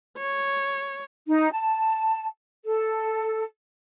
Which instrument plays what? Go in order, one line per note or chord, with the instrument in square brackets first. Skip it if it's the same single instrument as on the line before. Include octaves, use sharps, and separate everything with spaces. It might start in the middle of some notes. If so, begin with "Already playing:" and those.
[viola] C#5
[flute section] D#4
A5
A4